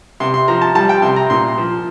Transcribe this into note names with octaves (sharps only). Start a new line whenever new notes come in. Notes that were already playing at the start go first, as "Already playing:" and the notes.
C3 C6
C6
F3 A#5
A5
G3 A5
G5
C3 C6
A#5
A#2 C6
F3